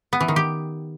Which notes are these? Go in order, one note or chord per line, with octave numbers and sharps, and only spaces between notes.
B3
E3
D#3
G4